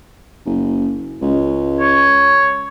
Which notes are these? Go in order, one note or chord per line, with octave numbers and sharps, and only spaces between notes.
F#1
C#2
C#5